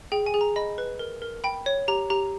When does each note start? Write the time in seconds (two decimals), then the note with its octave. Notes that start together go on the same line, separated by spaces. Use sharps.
0.12 G#4 G5
0.26 G#5
0.34 G#4
0.41 A#5
0.56 D#5 B5
0.78 B4
0.99 A#4
1.22 A#4
1.44 G5 B5
1.66 C#5
1.88 G4 A#5
2.10 G4 A#5